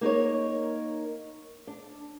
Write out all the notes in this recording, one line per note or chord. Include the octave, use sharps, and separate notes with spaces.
A#3 D#4 A#4 C#5
D4